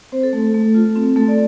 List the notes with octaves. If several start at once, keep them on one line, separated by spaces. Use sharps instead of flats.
C4 C5
A4
A3
A3
F4
C4
A3 A4
D5